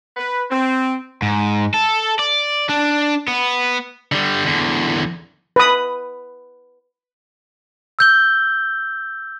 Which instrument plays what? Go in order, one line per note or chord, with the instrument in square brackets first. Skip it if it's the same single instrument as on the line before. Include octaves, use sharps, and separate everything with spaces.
[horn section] B4
C4
[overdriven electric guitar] G#2
A4
D5
D4
B3
[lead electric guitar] D3 G3
E2 D3
[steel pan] B4 D#6
[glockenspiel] E6 G6 G7